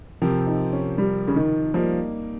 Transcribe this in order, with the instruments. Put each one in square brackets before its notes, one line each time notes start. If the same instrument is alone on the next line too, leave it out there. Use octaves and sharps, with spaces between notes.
[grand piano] C3 F3 C4 G4 A#4
[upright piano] D#4
C#4
G3
C#3
D#3
[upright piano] F3 [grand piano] G3 A#3 D#4